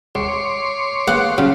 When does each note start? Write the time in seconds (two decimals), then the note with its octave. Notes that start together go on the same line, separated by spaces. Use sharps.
0.15 C#2 C#5 C6 D6
1.07 A#3 B3 G#4 F#5
1.38 C#3 F3 F#3 C#4